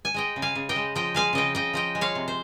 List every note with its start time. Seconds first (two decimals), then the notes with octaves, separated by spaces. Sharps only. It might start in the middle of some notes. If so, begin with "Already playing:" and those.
0.05 G#5
0.14 G#3 D#5 G5
0.36 C#3
0.42 F5 G#5
0.55 C#3
0.69 D#5 G5
0.76 G#3
0.95 F3 D#5 G5
1.15 G#3 F5 G#5
1.33 C#3 D#5 G5
1.55 C#3 D#5 G5
1.74 F3 D#5 G5
1.95 G#3
2.01 C#5 F5
2.15 C3
2.28 C5